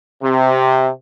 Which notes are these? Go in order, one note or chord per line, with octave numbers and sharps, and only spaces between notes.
C3